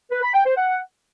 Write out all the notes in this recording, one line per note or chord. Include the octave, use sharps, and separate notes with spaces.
B4
B5
G5
C5
F#5